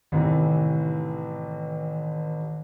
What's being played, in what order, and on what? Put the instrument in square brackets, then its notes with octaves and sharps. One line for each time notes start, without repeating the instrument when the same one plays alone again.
[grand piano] A1 C3 E3 [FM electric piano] D#3